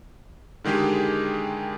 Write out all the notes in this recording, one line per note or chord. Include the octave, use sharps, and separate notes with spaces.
D3 D#3 G#3 G4 G#4